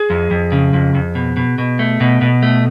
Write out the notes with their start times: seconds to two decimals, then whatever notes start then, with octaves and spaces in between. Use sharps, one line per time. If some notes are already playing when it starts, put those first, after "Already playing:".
Already playing: G#4
0.10 F2
0.31 F2
0.52 C#3
0.73 F2
0.95 F2
1.15 B2
1.37 B2
1.58 B2
1.79 A3
2.00 B2
2.21 B2
2.43 A3